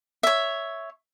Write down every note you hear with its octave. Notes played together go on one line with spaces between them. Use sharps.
C#5 E5